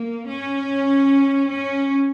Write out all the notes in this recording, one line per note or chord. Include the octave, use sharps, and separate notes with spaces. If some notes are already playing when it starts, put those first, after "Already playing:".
Already playing: A#3
C#4
C#4